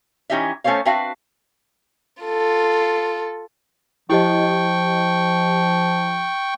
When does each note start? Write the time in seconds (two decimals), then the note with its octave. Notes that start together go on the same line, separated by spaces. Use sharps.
0.30 E3 C#4 D#4 G4 D#5 E5
0.64 A3 C#4 A4 C5 C#5 F5
0.85 C4 D4 F#4 B4 E5 F5
2.23 F4 A4
4.10 F3 E4 G4 D#5 G5 C#6